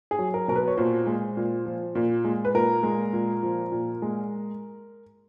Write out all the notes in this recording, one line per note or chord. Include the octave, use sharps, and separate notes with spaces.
G#4
F#3
A#4
B2 A#4
B4
C#5
A#2 C5
G#3
A#2
F3
A#2
G#3
B4
A#2 A#4
G#3
A#2
F3
A#2
G#3